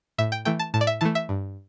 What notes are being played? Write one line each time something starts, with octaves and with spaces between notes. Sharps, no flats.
A2 E5
G5
E3 A3 G5
A5
A2 A5
D5
E5
E3 A3 A5
E5
G2